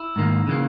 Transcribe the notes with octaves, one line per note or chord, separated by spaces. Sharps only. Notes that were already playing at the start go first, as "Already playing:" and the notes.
Already playing: E4
G#2 D#3 A#3
C#3 E3 A#3